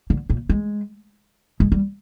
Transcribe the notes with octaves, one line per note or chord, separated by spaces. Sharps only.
D3
A#2
G#3
G#3
G3